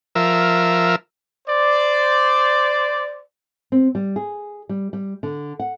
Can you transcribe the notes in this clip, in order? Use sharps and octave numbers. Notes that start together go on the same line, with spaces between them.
F3 A#4 E5
C5 D5
C4
G3
G#4
G3
G3
D3
F#5